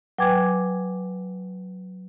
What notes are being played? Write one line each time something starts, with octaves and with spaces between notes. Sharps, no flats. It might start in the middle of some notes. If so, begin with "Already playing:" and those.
F#3 B4 G5 G#5 D6 G#6